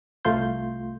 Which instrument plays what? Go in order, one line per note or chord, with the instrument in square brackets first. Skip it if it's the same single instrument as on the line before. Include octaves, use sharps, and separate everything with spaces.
[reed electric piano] C2 A3 F4 C6 G6